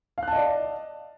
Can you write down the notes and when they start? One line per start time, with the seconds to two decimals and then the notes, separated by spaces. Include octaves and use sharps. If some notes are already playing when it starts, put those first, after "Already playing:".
0.18 F5
0.23 F#6
0.28 A5
0.33 D#5
0.37 D5